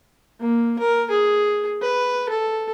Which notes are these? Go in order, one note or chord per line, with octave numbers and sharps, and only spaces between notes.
A#3
A#4
G#4
B4
A4